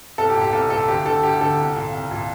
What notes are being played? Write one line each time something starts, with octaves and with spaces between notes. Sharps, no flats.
C2 A4
G4
A#2
G4
C2 A4
A#2 A4
D2 G4
D3 A4
D2 G4
D3 A4
C2
A#2
C2
A#2